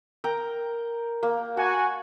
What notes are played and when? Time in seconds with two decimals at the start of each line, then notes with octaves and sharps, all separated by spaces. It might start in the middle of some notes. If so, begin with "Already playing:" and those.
0.24 A#4 G5 A#5
1.23 A#3
1.57 F#4 G#5 A5